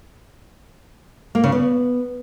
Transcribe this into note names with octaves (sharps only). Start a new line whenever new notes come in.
A#3
C#3
B3